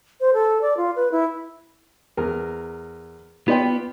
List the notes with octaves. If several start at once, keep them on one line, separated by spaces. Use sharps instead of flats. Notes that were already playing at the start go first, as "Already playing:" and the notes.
C5
A4
D5
F4
B4
E4
E2 A#4
B3 F4 D5 G5